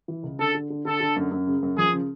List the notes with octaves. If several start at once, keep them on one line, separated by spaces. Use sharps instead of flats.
E3
C#2
D3 A4
D3
D3
D3 A4
D3
F#2
F#2
C#3
F#2
F3 G#4
C#3